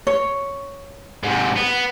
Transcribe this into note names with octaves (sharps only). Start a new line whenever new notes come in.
C#5
G#2 C3
B3